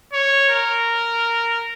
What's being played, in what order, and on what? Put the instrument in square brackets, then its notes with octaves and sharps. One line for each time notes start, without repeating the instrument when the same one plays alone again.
[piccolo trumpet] C#5
A#4